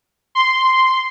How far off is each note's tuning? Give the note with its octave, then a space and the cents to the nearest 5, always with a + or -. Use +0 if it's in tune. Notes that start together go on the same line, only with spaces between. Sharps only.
C6 -5